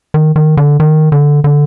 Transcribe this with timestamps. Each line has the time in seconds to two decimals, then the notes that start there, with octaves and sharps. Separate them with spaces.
0.14 D#3
0.36 D#3
0.57 D3
0.80 D#3
1.12 D3
1.44 D3